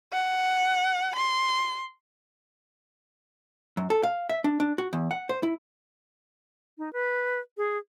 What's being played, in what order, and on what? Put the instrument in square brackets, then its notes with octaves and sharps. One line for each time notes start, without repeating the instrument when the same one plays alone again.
[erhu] F#5
C6
[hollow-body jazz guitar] F#2
A4
F5
E5
D4
D4
F#4
E2
F#5
C5
E4
[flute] D#4
B4
G#4